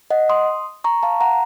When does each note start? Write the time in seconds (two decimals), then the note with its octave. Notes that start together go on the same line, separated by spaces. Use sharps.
0.10 D#5 F#5
0.29 C6 D#6
0.84 A#5 C#6
1.03 F5 A5
1.21 F#5 A#5